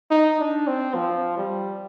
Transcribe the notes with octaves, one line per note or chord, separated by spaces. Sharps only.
D#4
D4
C4
F3
G3